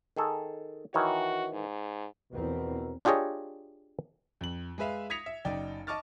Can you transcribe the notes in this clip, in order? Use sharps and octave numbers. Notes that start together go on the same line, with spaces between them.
D#3 G#4 A4
D#3 E3 F#4 C#5
G#2
E2 B2 F3 C4 A#4
D4 F4 G4 G#4 C#5 D#5
F2 F#7
G#3 G#4 B4 E5 F5
D#6 G#6 A#6 B6 C#7 F7
E5
F#1 D#4 D5 G5
D#5 A5 C#6 D6 F6 A6